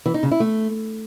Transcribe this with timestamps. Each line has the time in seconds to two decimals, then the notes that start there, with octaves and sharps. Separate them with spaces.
0.06 E3
0.14 D#4
0.23 C#3
0.31 E4
0.40 A3